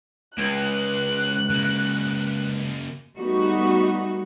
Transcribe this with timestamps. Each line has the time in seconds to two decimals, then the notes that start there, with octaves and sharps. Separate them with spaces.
0.38 C#2 G#3 C#4 F#6
1.50 C#3 A#3
3.15 G3 A3 B3 D#4 F#4